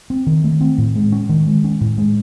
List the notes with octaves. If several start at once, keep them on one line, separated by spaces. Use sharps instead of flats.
C4
D#3
A3
C4
A2
G#3
C#4
D#3
G#3
C#4
A2
G#3